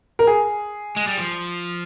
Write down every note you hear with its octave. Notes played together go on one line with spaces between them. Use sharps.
A#4
G#4
G#3
G3
F3